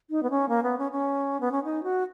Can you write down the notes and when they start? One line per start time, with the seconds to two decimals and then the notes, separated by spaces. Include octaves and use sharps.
0.10 D#4
0.23 B3
0.30 C#4
0.49 A#3
0.63 B3
0.78 C#4
0.91 C#4
1.40 B3
1.52 C#4
1.64 D#4
1.83 F#4